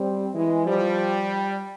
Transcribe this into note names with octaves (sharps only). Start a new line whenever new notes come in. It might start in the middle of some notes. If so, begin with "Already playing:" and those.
Already playing: G3 C4
E3 G#3
F3 G3